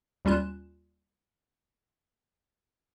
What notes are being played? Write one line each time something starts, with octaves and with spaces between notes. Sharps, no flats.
D#2 G3 C#4 F4 F#6 E7